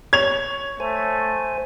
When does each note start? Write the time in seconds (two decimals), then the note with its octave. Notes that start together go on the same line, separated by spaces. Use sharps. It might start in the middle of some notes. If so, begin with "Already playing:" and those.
0.13 C#5 G#6 F7
0.80 A3 C5 G#5